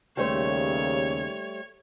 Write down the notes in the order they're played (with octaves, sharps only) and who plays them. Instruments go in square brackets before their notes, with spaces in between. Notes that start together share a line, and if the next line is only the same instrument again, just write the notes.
[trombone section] D#2 C#3 [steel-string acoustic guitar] G3 A3 C5 [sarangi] C#5